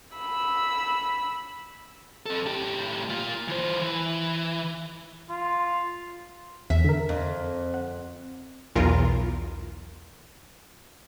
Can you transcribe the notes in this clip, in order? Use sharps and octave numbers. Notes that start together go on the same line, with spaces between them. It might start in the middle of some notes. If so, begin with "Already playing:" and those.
B5 E6
C4 A4
A2 G4
A#3 F4
E3 C5
E3
F4
E2 E5
D3 A#4
F2
F#5
B1 E2 F4 A#4